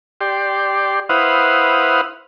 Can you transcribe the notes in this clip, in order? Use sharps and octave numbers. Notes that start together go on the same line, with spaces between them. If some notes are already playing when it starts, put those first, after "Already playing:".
G4 D5 C6
E4 B4 C5 F5 F#5 D#6